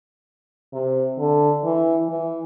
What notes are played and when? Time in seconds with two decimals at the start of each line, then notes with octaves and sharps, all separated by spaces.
0.73 C3
1.18 D3
1.64 E3
2.09 E3